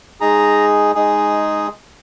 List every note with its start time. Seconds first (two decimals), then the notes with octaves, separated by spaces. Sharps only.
0.20 G#3 D#4 G#4 A#5
0.95 G#3 D#4 G#4